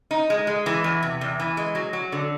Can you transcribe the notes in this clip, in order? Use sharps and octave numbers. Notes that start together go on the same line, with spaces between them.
D#4
G#3
G#3
E3
E2
C3
E2
E3
G#3
F#3
F#3
D3